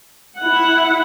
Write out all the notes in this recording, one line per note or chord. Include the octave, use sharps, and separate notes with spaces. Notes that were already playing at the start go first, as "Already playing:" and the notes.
E4 F#5